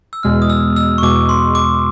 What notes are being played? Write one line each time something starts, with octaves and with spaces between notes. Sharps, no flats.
E6
E2 B2 G#3 F6
D#6
E6
E6
C#6
E2 B2 G#3 D6
C6
D6